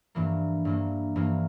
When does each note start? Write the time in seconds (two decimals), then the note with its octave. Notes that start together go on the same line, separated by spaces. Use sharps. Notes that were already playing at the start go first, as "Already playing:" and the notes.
0.15 G2 E3 A#3
0.65 G2 E3 A#3
1.16 G2 E3 A#3